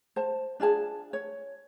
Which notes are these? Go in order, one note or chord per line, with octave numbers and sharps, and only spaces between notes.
C5 A5
D4 F4 G#4 A5
C#5